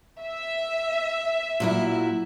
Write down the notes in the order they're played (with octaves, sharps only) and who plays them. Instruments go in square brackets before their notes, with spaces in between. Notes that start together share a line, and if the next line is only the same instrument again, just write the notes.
[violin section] E5
[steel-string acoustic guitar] A#2 F#3 E4